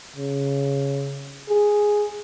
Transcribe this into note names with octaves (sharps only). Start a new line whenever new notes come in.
C#3
G#4